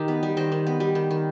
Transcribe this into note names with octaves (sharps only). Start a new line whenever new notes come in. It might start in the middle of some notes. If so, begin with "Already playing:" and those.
Already playing: D#3 D#4 G4
B3
G3
D#3 C5 D#5
D#3
B3
G3
D#3
D#3